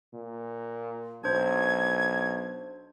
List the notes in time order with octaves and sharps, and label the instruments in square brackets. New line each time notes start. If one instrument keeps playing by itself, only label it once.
[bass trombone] A#2
[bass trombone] B1 [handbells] D4 C5 [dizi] G#6